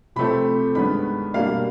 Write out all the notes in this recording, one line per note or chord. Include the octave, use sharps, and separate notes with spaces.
C3 F3 A3 C4 B5
G2 D#3 G#3 B3 B5
B2 G3 A#3 D4 F5